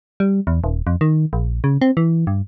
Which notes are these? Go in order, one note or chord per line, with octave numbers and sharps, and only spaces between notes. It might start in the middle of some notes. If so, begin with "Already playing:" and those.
G3
E2
D#1
F2
D#3
A#1
C#3
C4
E3
G2